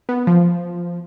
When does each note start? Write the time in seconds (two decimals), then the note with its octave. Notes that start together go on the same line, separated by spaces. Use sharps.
0.09 B3
0.27 F3